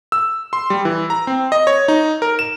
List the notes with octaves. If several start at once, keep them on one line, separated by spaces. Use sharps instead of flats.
E6
C6
G3
E3
A#5
C4
D#5
C#5
D#4
A#4
E7